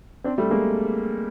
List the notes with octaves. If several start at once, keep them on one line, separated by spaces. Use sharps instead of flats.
C4 D4
G3 A3
G#3 A#3